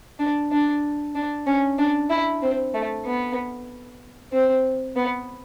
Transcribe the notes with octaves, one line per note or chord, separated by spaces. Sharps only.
D4
D4
D4
C#4
D4
E4
C4
A3
B3
C4
B3